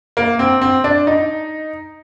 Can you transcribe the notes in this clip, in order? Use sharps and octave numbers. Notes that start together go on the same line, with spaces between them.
A#3
C4
C4
D4
D#4